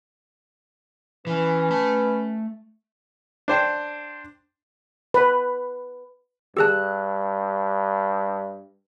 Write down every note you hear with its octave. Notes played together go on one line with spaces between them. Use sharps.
E3 C#4 B4
A3 A5
D4 C5 G5
B4
G2 G4 G#4 A5 E6 F#6